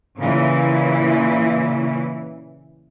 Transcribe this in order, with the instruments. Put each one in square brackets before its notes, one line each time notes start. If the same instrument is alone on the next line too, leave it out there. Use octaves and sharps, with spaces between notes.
[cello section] A#2 C#3 E3